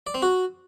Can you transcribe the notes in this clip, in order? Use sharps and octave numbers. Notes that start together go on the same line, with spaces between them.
D5
C4
F#4